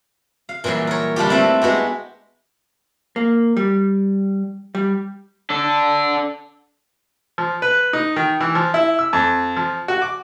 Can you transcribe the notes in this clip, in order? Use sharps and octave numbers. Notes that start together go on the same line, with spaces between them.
F5
A#2 E3 F#3 G3 C6
A#4 C#5
G3 D4 F4 G4
A3 C4 E4
G#3 B3 F#4 G4
A#3
G3
G3
D4 A4
F3
B4
D#4
D#3
E3
F3
E4
E6
F2
F3
F#4
D6